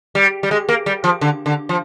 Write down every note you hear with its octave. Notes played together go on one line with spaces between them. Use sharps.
G3
G3
G#3
A#3
G3
F3
D3
D3
F3